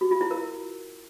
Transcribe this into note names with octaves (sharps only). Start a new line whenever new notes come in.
F#4
F4
E4
A#4